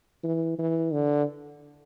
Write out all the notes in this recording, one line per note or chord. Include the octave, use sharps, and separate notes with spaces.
E3
E3
D3